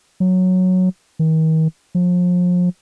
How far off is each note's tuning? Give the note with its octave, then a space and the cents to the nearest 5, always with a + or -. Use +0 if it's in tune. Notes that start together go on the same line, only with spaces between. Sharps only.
F#3 -5
D#3 +40
F3 +35